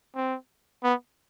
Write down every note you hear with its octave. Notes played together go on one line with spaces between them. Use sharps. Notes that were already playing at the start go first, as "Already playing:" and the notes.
C4
B3